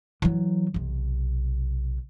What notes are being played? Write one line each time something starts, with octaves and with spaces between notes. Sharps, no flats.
E3 F#3
B1 C3